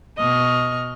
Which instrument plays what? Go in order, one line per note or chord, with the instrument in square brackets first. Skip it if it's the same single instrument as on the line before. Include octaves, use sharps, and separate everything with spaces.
[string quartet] B2 D#5 C#6 F6